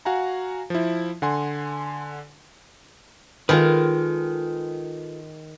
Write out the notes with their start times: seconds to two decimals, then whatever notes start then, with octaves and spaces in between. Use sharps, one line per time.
0.05 F#4 F5 F#5 G#5 A#5
0.70 F3 E4
1.22 D3 F#5 G#5 C6
3.49 D#3 G#3 F4 G#4 A4 B4